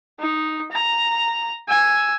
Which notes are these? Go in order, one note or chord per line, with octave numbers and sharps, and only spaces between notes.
D#4
A#5
G#5 E6